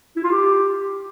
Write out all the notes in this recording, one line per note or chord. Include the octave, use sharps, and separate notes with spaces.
E4
F4
G4